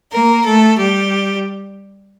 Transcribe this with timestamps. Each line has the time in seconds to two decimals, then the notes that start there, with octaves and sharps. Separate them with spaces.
0.12 A#3 A#4
0.45 A3 A4
0.78 G3 G4